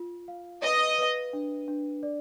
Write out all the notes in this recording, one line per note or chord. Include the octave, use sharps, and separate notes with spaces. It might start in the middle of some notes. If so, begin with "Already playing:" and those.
Already playing: F4
F5
B4 D#5
B4
D4
D4
D5